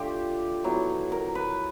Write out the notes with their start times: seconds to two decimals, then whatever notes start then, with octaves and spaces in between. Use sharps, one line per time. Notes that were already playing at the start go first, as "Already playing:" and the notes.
Already playing: A3 D4 F4 G4
0.64 F#3 B3 E4
1.12 A#4
1.35 B4